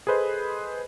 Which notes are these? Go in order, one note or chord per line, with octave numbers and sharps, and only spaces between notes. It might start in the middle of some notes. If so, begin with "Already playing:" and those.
G#4 A4 B4 C5 D#5